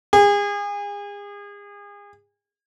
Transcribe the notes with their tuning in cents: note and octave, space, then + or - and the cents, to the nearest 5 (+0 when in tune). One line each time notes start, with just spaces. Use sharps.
G#4 -35